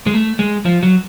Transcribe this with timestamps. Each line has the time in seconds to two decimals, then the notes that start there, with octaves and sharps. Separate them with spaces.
0.07 G#3
0.14 A3
0.39 G#3
0.65 F3
0.83 F#3